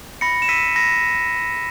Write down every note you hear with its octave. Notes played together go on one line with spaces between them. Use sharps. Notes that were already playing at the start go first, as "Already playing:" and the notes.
B5 A#6 C#7
E7
E6 B6 D#7
B5 A#6